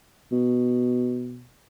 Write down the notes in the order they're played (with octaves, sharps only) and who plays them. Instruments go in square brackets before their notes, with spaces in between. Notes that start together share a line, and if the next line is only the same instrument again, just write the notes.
[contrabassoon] B2